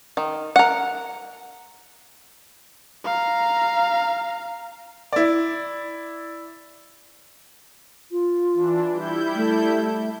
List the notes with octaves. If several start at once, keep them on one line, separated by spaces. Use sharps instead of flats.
D#3
A#4 F#5
F5 A#5
E4 D5
F4
E3 D4
G3 E4 G6
A3